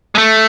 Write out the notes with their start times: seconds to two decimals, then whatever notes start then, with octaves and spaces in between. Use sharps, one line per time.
0.15 G#3
0.18 A3